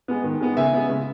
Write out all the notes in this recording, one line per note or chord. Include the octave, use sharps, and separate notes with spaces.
G#3 B3
D#3
G#3 B3
C#3 E5 G#5
G#3 B3
C#3